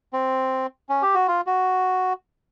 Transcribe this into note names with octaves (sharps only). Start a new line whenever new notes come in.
C4
C#4
G4
F#4
F4
F#4